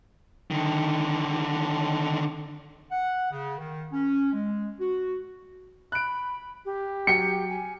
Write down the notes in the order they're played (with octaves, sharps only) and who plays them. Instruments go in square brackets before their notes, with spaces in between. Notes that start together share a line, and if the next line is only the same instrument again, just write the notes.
[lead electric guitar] D3 D#3
[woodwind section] F#5
C#3
D#3
C#4
G#3
F#4
[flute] B5 [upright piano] F#6 D7
[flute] G4
[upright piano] F#3 G5 [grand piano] C#7
[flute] G#5